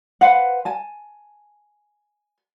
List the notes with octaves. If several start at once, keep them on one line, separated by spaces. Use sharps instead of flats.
B4 C5 F5 F#5
G#5 A5